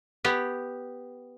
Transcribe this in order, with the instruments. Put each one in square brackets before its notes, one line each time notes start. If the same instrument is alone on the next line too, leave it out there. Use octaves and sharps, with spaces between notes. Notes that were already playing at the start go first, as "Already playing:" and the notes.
[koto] B3 G4